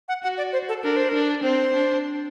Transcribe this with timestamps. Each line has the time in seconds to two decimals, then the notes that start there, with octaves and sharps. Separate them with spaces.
0.08 F#5
0.23 F#4 F#5
0.38 D5
0.53 C5
0.69 A4
0.83 D4 A#4
0.96 C5
1.09 D4 A#4
1.43 C4 C5
1.74 D4